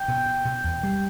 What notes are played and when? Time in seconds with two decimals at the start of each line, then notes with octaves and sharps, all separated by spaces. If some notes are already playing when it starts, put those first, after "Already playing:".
Already playing: G5 G6
0.08 B2
0.26 B2
0.45 B2
0.64 E2
0.83 G3